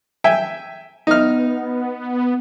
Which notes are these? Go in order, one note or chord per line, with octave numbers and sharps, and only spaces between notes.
E5 G5 G#5
B3 D#4 F6